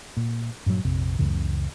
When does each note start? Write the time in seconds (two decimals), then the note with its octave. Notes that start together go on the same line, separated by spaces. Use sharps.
0.17 A#2
0.66 G2 A#2 C#3 F#3
0.85 A#1 F2 C3
1.19 C#2 F#2 C#3 E3